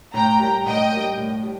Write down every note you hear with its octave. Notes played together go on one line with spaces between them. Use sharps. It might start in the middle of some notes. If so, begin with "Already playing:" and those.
A2 G5 A#5
G3 A#3
A2 D#5 G5
G3 A#3
A2
G3